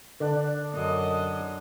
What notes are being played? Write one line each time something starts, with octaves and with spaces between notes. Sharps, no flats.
D3 D4 D5
F#2 D#5